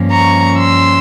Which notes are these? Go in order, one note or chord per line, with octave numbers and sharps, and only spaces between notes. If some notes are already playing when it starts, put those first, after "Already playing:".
Already playing: G2 F3 A#3 C#4
A#5 C#6
C6 E6